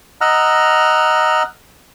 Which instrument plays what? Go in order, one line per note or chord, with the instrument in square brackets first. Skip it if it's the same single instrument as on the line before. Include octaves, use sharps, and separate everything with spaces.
[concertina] D#5 F#5 A#5 E6 F6